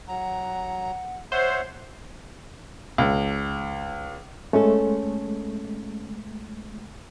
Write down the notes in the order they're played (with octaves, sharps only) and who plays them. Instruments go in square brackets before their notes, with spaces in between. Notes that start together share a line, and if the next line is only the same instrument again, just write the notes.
[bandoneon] F#3 A#5 [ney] F#5
[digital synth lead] C5 [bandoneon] C#5 E5 F#5
[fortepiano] C#2
[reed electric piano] G#3 A3 [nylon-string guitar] C#4 A4